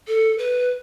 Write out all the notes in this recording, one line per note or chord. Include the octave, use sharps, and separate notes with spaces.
A4
B4